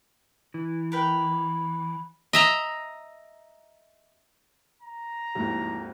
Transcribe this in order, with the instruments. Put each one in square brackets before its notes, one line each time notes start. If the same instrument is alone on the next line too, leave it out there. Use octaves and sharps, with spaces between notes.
[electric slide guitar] E3
[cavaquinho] A#4 B4 G5
[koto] D#5 E5 A#5
[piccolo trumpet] A#5
[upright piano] G#1 D#2 [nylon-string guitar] F3 A3 E4